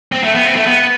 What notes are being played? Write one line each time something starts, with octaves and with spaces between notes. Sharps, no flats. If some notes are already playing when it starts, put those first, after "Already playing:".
C4
A3
B3
C4
A3
B3